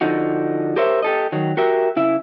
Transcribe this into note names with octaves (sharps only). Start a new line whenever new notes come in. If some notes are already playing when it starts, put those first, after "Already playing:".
D3 F3 D#4 F#4
G4 A#4 C5 C#5 E5
G4 A4 D#5
D#3 F#3
F#4 G4 A#4 E5
C#3 E4 E5